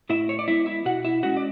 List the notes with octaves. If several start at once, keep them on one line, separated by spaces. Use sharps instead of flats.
A2 E4 E5
C#5
D5
G#3 B3 E4 E5
E4 E5
B2 F#4 F#5
E4 E5
G#3 C#4 F#4 F#5
D5